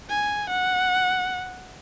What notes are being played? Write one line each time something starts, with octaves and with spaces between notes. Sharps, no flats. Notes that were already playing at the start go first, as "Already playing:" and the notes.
G#5
F#5